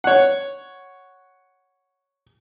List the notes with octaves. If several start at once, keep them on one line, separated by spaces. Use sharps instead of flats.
C#5 F#5